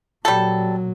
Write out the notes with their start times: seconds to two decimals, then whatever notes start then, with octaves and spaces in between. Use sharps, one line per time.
0.25 A#2 F#3 G3 A4